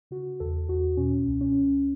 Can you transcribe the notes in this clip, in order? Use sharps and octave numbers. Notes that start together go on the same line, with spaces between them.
C#3 F#4
E2 A4
E2 F#4
B2 C#4
C#2
C#4
C#2